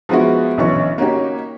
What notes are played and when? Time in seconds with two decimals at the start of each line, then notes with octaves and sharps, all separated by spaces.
0.09 F3 G#3 B3 E4 F#4
0.58 B1 D3 E3 C#4 D4 C#6
0.98 A#3 C#4 D#4 F#4 G4